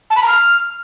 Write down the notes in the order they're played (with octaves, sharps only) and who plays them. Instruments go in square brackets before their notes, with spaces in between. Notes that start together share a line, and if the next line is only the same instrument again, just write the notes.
[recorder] A5
B5
A#5
F6